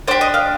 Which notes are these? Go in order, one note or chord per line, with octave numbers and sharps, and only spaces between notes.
D4 G4 C5
D#5
F5